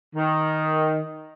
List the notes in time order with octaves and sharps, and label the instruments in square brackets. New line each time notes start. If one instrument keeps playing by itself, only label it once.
[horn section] D#3